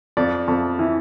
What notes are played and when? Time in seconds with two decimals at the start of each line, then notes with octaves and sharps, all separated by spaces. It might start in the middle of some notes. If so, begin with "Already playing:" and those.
0.17 F2 D5
0.48 F2
0.79 E3